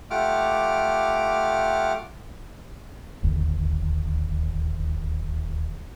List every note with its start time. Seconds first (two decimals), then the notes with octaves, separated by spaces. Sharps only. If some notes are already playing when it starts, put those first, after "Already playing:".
0.11 A3 F4 G4 F#5 D6 F6
3.23 D1 G1 D#2